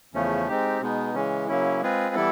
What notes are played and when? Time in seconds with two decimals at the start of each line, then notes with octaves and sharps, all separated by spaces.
0.14 E2 C#3 F3 A3 C#4
0.48 G#3 C4 D#4 G4
0.81 B2 G#3 B3 D#4
1.14 C#3 E3 G#3 C#4
1.48 C#3 F#3 A#3 C#4 E4
1.82 G#3 C4 F4 G#4 B4
2.15 E3 G3 B3 E4 A4